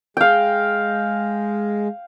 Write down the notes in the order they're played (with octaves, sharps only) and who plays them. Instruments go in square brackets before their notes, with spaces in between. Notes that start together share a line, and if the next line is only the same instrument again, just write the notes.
[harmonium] G#3 [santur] F5 G5